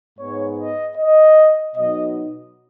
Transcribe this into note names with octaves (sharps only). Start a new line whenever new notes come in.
G#2 G#3 B3 C#5
D#5
D#5
B2 F#3 D#4 D#5